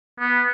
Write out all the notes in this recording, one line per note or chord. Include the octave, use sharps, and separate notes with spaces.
B3